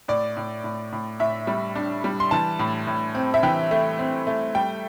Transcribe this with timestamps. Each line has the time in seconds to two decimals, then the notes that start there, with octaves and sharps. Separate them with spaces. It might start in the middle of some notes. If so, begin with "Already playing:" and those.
0.08 A2 D5
0.37 A2
0.64 A2
0.92 A2
1.20 A2 E5
1.47 G3
1.75 D4
2.04 G3
2.20 C6
2.31 E3 A5
2.59 A2
2.87 A2
3.15 C4
3.34 E5
3.43 E3 G5
3.71 A3
3.99 C4
4.27 A3
4.55 G3 G5